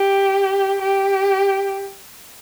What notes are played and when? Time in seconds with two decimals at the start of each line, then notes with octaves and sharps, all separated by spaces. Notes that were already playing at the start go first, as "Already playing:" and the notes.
Already playing: G4
0.82 G4